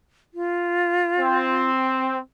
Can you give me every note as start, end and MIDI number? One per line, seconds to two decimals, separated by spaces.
0.34 1.69 65
1.19 2.18 60